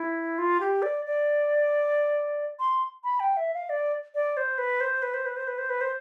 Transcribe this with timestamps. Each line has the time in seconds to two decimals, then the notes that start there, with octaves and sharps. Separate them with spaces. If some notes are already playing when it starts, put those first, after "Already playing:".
Already playing: E4
0.38 F4
0.60 G4
0.82 D5
1.05 D5
2.60 C6
3.04 B5
3.20 G5
3.37 E5
3.54 F5
3.69 D5
4.15 D5
4.37 C5
4.58 B4
4.81 C5
5.02 B4
5.14 C5
5.26 B4
5.36 C5
5.47 B4
5.58 C5
5.70 B4
5.81 C5